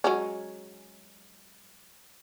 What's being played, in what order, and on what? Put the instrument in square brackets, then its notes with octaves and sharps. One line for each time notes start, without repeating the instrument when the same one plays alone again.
[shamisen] F#3 G#3 C#4